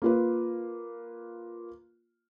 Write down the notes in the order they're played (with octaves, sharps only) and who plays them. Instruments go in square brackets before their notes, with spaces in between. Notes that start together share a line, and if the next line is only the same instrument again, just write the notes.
[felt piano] A#3 F4 B4